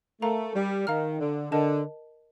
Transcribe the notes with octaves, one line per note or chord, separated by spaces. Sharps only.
A3 A#4 F5 A#5
G3
D#3 F5 A#5 F6
D3
D3 A#4 D#5 A5